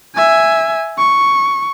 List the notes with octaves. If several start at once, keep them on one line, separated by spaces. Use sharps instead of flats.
E5 G#5
C#6